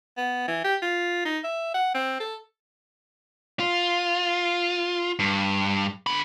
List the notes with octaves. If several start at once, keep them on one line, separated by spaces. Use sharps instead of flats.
B3
E3
G4
F4
D#4
E5
F#5
C4
A4
F4
G2
D3 B5